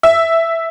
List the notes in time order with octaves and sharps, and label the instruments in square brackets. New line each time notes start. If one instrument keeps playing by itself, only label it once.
[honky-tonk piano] E5